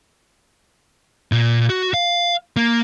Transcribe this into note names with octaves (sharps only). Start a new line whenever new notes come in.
A#2
F#4
F5
A#3